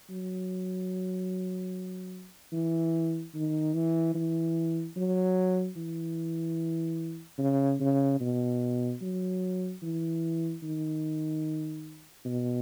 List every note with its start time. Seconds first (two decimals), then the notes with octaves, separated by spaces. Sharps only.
0.10 F#3
2.53 E3
3.35 D#3
3.74 E3
4.15 E3
4.97 F#3
5.77 E3
7.39 C#3
7.80 C#3
8.21 B2
9.02 F#3
9.83 E3
10.63 D#3
12.26 B2